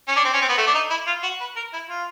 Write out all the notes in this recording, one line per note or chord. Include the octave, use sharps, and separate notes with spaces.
C#4
D4
C4
C#4
C4
B3
A3
D4
D#4
E4
F4
F#4
B4
A#4
E4
F4